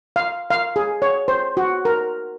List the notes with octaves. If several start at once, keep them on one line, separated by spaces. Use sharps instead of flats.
F5
F5
G#4
C#5
C5
F#4
A#4